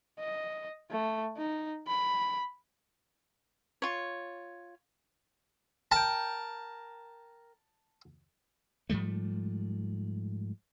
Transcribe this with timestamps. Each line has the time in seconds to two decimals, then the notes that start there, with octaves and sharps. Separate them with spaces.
0.19 D#5
0.90 A3
1.37 D#4
1.87 B5
3.82 F4 C#5
5.92 A#4 G5 A5
8.90 G#2 F3 G3 A3